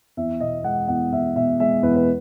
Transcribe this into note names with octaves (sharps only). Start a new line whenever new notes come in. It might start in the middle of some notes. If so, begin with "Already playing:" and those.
E2 E5
B2 D#5
G#3 F#5
E2 F#5
E2 E5
B2 E5
G#3 E5
E2 B4
B4